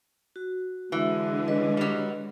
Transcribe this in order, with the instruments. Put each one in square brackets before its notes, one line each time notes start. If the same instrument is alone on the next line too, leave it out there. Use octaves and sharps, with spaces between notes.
[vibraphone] F#4
[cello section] D3 G#3 [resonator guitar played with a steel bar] E3
[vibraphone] B4 C#5 D#5
[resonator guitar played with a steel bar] F#3 G3